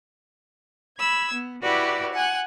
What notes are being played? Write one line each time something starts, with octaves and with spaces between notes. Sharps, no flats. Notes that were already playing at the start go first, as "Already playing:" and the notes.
B5 E6 G#6
B3
E4 F#4 G4 B4 D5
F#5 G#5 F#6